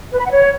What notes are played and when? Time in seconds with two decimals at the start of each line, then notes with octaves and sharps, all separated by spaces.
0.11 B4
0.18 B5
0.24 F#5
0.30 C#5